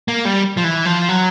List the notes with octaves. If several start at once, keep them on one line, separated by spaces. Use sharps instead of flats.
A#3
G3
F3
E3
F3
F#3